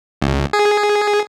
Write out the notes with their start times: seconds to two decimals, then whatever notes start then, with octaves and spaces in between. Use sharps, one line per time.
0.22 C#2
0.53 G#4